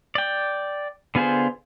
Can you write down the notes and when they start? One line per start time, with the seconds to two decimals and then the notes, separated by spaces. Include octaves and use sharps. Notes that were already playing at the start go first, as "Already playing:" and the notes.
0.15 D5 G5
1.15 D3 B3 F4 G#4 C5